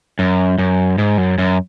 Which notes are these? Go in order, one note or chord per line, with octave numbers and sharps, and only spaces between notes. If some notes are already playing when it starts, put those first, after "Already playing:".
F#2
F#2
G#2
F#2
F#2